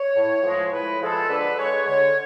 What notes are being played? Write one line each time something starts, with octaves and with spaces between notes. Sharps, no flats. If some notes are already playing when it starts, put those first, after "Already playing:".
Already playing: C#5
A2
F3 G#3
A2 B4
F3 G#3 A4
D3 B4
G#3 C#5
D3 C#5